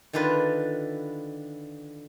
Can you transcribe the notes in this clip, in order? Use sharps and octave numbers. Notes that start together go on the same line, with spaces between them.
D3 D#3 D4 F4 B4